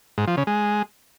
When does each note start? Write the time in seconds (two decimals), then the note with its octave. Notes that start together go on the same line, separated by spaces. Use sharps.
0.18 G#2
0.27 F3
0.37 C#3
0.47 G#3